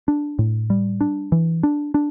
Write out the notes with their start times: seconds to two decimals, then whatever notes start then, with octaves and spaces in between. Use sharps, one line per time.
0.08 D4
0.39 A2
0.70 G3
1.01 D4
1.32 E3
1.63 D4
1.94 D4